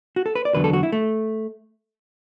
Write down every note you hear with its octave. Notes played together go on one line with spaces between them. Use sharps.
F#4
A4
B4
D5
E2 D3 F#3 B4
A4
F#4
E4
A3